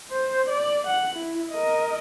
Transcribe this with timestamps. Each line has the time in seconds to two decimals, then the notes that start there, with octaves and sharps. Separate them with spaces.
0.11 C5
0.50 D5
0.87 F#5
1.17 E4
1.51 A#4 D#5